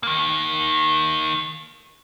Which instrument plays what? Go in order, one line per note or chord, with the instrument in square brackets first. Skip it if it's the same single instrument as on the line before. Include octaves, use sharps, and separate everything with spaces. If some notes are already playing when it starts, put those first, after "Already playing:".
[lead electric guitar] D#3 A#3